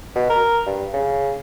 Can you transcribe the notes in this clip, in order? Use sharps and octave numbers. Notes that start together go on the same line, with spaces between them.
B2
A#4
G2
C#3